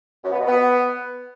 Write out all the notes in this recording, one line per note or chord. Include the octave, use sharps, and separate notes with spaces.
F#2
B3
B2
B3